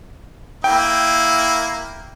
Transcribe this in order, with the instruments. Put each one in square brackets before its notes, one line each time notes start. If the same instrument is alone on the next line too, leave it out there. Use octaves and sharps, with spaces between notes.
[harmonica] A#3 E4 [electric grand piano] G5